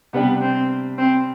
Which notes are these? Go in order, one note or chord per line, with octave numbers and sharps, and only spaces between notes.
C3 G3 B3 D4 G4
C4
C4